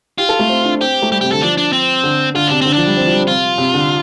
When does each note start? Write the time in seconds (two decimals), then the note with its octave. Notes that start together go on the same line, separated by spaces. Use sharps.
0.18 F4 G4
0.29 A4
0.39 A3
0.49 C4
0.64 D4
0.80 C4 G4
1.02 A3
1.11 G3 G4
1.21 C3 G4
1.32 D3 A4
1.42 F3 D4
1.57 D4
1.73 C4
2.03 D3
2.34 D3 F4
2.47 C3 D4
2.61 D3 C4
2.73 F3 D4
2.86 G3
2.97 C4
3.06 F3
3.12 G3
3.27 C3 F4
3.58 C3
3.74 D3